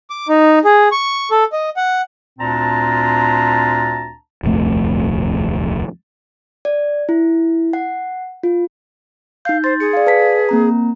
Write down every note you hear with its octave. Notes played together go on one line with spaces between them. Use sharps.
D6
D#4
G#4
C#6
A4
D#5
F#5
D2 A#2 C4 D4 A5 A#5
D#1 C2 F2 A3
D5
E4
F#5
F4
D#4 F5 G6
C5 C6 A6
G#4 C#7
D5 F5
B4 A5 B6
A#3 C4 A#5